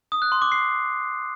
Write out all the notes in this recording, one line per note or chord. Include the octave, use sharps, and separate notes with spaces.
D#6
F#6
C6
D6
C7